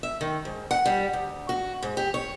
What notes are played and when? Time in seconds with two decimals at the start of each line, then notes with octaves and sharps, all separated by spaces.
0.03 E5
0.21 D#3
0.45 G#2
0.71 F#5
0.86 G3
1.13 D2
1.49 F#4
1.83 G#2
1.97 G4
2.14 C#5